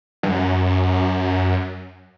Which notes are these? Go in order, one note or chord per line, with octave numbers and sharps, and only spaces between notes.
G2
F#2